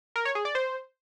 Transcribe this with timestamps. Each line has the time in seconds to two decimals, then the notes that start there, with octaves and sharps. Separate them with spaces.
0.16 A#4
0.25 C#5
0.35 G#4
0.45 D5
0.55 C5